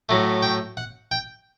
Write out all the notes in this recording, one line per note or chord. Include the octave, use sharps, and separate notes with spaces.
A2 F#3 A3
G5
F#5
G5